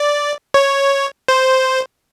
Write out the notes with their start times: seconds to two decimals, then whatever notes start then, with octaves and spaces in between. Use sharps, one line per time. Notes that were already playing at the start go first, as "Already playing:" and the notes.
Already playing: D5
0.54 C#5
1.28 C5